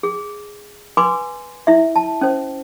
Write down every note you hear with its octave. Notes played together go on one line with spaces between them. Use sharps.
G#4
B4 G#5 C6 D6
E4 E5
A5
C#4 C5